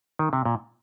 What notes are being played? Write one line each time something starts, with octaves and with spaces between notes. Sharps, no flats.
D#3
C3
A#2